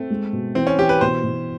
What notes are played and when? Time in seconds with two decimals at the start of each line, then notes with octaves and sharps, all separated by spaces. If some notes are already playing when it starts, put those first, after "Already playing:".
Already playing: A3 C4
0.10 G#3
0.33 B2
0.55 E3 C4
0.67 C#4
0.79 E3 G4
0.89 B4
1.01 B2 C5
1.24 B2